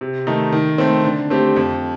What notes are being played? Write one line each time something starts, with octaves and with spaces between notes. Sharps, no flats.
C3
D#3 A3 D#4
D#3
A3 C4
D3
A3 C4 G4
F2